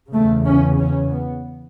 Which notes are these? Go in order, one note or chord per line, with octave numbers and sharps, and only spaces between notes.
E2 C#3 A3
C#4
C#4
B3